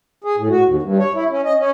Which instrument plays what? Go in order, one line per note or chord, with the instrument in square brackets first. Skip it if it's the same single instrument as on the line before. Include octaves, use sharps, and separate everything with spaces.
[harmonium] G#4
A2
F#4
D#2
G2
C#5
E4
C#4
D#5
C#4